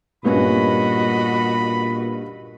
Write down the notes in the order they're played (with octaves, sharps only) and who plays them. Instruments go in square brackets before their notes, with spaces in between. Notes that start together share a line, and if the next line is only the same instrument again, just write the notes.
[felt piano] G2 B3 C#4 [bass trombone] A#2 [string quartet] F#4 D#5 [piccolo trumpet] B5